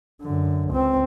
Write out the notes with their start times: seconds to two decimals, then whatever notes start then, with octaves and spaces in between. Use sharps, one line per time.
0.22 F#2 D3
0.70 C#2 C4